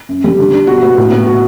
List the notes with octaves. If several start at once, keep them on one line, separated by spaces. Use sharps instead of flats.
F#2
G3
D3
D4
B2 F#4
B3
A2
B3
F#4